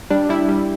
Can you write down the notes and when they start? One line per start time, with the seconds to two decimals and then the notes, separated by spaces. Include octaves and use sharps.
0.10 G3 D4
0.29 G3 E4
0.49 G3